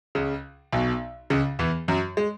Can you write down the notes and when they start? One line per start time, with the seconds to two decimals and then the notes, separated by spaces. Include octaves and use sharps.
0.15 C#2 C#3
0.72 B1 B2
1.30 C#2 C#3
1.59 E2 E3
1.88 F#2 F#3
2.17 G#3